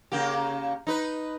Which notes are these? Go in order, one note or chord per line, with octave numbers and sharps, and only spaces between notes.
C#3 A#3 G4
D#4 B4